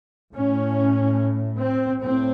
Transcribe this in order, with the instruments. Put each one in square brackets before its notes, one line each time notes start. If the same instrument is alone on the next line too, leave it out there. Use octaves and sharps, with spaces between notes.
[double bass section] A2 C#4
C4
A2 C4